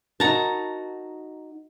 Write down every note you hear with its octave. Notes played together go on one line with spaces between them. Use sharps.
D#4 F#4 A#4 A5 A#5